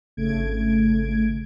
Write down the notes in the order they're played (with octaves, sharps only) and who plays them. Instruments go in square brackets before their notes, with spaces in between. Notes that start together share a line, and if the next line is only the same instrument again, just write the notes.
[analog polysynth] G#1 C#3 A3 G#6 D7